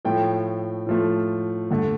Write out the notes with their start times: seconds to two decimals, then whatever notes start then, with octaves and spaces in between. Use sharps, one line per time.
0.05 A2 F3 A3 G5
0.87 A2 F3 A3
1.71 G2 D3 A3